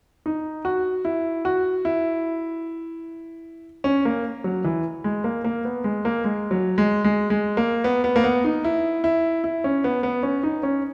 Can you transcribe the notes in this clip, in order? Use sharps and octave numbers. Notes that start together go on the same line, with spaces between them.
D#4
F#4
E4
F#4
E4
C#4
A#3
F#3
E3
G#3
A#3
A#3
B3
G#3
A#3
G#3
F#3
G#3
G#3
G#3
A#3
B3
B3
A#3
B3
D#4
E4
E4
E4
C#4
B3
B3
C#4
D#4
C#4